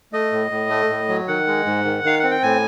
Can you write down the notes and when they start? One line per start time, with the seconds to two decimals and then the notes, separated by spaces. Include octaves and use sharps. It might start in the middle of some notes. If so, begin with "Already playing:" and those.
0.13 A3 D#5
0.32 A2
0.51 A2
0.70 A3
0.90 A2
1.09 F#3
1.28 D#3 F#5
1.47 G#3
1.66 G#2
1.85 D#3
2.04 D#3 F5
2.19 C4 F#5
2.31 G5
2.43 A2 G#5